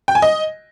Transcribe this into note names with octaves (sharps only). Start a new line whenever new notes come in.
G5
G#5
D#5